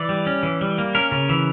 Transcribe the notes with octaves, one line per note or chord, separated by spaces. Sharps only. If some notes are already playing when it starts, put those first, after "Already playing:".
Already playing: E3 D5
G3
C#4
E3
G3
A#3
C#4 A#4
C#3
E3